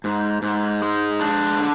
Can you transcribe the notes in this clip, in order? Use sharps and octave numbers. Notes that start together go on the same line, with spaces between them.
G#2
G#2
G#3
D4
D3